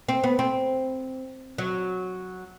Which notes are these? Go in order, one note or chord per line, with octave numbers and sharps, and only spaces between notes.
C4
B3
C4
F#3